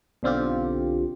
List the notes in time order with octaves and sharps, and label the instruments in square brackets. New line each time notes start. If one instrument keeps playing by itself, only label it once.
[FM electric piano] B1 D3 C4 F4 G4